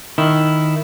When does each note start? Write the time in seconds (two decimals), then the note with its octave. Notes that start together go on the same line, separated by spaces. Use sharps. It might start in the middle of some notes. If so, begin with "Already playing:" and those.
0.18 D#3 E4